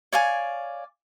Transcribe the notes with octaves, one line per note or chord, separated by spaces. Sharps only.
C#5 D5 F5 G#5